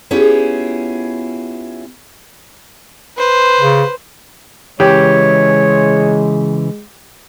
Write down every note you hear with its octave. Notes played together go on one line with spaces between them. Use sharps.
B3 C#4 E4 F4 G4 G#4
B4 C5
C#3
C#3 E3 G#3 G4 C#5